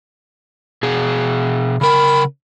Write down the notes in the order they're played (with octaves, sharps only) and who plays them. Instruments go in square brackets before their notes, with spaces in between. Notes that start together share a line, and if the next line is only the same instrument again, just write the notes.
[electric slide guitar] B2 G#4
[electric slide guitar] C#3 A#4 [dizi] B5